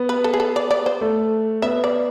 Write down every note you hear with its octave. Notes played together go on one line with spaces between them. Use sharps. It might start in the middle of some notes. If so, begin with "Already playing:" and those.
Already playing: B3
B4
A4
G#4
A4
D5
D5
C5
A3
B3 E5
D5